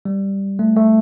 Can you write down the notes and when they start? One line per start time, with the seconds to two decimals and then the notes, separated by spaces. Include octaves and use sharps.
0.05 G3
0.59 A3
0.77 A3